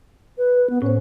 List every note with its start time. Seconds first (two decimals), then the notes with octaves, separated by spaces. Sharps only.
0.38 B4
0.70 B3
0.82 A2 C#4 C5